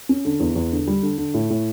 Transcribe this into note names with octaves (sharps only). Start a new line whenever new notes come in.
C#4
D3
E2
E2
D3
G3
D3
D3
A2
A2